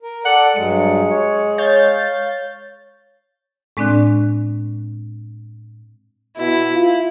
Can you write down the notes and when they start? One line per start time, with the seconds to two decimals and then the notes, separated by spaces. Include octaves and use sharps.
0.03 A#4
0.25 A4 D5 F#5
0.56 G2 F#3 G#3 C#7
1.10 C#5
1.58 C#5 F5 G6 A6
3.77 A2 G#3 C4 D4 D5 F#6
6.38 B2 E4
6.74 F4